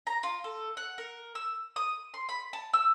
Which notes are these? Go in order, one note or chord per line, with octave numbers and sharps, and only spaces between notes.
A#5
F4
A4
F#5
A#4
E6
D#6
C6
B5
A5
E6